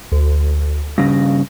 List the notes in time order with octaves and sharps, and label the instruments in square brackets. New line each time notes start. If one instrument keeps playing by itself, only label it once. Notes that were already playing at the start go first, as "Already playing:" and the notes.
[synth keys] D2
[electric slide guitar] G2 C#3 [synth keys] A#6